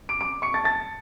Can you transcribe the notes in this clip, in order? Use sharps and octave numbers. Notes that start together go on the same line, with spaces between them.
D6 D7
D6 D7
C#6 C#7
A5 A6
A5 A6